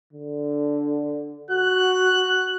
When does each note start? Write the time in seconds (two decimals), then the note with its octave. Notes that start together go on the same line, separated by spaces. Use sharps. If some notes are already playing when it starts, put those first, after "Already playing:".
0.13 D3
1.51 F#4 F#6